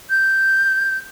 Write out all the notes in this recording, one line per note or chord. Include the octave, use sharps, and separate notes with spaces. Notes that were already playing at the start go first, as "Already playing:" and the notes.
G6